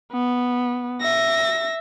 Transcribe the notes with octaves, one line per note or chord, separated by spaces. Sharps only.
B3
E5 A#6